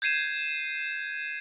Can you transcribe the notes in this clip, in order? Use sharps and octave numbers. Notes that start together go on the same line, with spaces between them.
G6 G#6 C7 D#7 E7